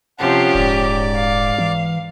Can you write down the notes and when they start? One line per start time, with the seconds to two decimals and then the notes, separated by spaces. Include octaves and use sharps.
0.19 C3 F3 C#4 G4 F#5 A5
0.55 D#1 G#2 D5 D6
1.15 F5
1.58 E3